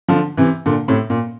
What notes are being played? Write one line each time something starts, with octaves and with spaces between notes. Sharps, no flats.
D3 F3
C3 E3
A#2 D3
A2 C3
A#2